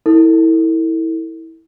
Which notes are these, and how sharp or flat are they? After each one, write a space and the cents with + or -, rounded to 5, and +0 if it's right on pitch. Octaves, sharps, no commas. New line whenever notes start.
E4 -20 A4 +35